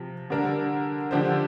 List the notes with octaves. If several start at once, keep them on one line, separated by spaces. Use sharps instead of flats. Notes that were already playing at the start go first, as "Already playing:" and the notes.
Already playing: C3 F3
D3 G3 D4 A#4
D3 F3 D4 G4 C5